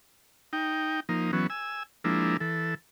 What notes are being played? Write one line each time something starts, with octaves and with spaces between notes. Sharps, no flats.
D#4 G5
F3 A#3 D#4
E3 F#3 B3 C#4
G#5 E6
F3 G#3 A#3 D4 E4
E3 A4